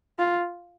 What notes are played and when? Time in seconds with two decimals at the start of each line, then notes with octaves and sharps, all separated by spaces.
0.19 F4